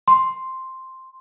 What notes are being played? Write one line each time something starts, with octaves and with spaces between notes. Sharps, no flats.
C6